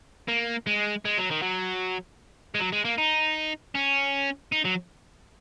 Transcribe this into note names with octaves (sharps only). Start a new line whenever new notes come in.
A#3
G#3
G#3
F#3
D#3
F#3
G#3
F#3
G#3
A#3
D#4
C#4
D#4
F#3